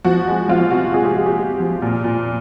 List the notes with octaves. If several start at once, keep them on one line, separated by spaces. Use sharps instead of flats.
F3 F#4
G#3
F3 F4
C3 F#4
G#3 G#4
G4
G#3
G4
G#3
F3
A#2
A#2